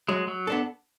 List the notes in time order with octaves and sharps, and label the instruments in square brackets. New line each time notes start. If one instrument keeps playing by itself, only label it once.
[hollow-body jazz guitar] F#3 [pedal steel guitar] G#3
[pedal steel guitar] F#3
[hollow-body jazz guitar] B3 D4 A4